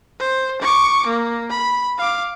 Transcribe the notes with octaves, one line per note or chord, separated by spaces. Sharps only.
C5
C#6 D6
A#3
B5
F5 D6